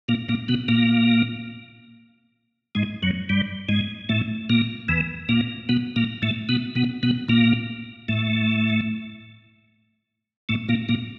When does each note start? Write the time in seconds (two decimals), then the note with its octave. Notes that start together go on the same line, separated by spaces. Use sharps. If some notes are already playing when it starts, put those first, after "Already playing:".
0.08 A#2 A#3
0.28 A#2 A#3
0.48 B2 B3
0.68 A#2 A#3
2.75 G#2 G#3
3.02 F#2 F#3
3.29 G2 G3
3.68 G#2 G#3
4.09 A2 A3
4.50 A#2 A#3
4.88 E2 E3
5.29 A#2 A#3
5.69 B2 B3
5.96 A#2 A#3
6.22 A2 A3
6.49 B2 B3
6.75 B2 B3
7.03 B2 B3
7.28 A#2 A#3
8.08 A2 A3
10.49 A2 A3
10.69 A#2 A#3
10.89 A#2 A#3